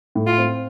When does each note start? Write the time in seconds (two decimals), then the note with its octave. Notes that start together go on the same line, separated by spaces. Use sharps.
0.15 A2
0.27 F4
0.38 C4